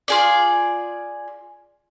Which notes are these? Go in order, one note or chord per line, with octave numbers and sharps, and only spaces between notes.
F4 G#4 D5